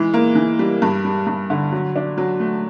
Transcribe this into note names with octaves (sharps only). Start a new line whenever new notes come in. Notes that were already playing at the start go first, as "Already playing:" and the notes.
Already playing: E3 G#3
A#3
E3
G3
G2
G3
G2
D3
F#3
D4
F#3
A3